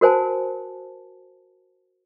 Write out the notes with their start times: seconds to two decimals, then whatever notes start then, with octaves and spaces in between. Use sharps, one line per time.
0.01 F#4 A#4 C5 G#5 A5